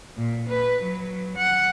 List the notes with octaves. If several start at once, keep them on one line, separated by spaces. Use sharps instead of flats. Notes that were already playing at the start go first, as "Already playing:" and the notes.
A#2
B4
F#3
F#5